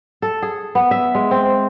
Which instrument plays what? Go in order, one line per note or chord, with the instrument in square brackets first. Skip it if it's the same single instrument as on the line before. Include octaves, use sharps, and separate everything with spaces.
[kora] A4
G#4
B3
E5
G#3
C4